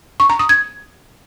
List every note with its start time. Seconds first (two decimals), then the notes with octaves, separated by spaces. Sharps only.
0.20 C#6
0.30 A#5
0.39 D#6
0.49 G#6